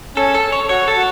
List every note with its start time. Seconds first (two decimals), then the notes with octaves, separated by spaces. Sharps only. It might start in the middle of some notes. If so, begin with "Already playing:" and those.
0.16 C#4 A4
0.34 A4
0.52 C#5
0.69 F#4 C#5
0.88 A4
0.96 F#4